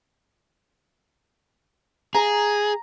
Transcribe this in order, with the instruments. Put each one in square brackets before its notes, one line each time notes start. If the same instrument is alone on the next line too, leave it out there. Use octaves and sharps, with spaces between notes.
[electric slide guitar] G#4 [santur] A#5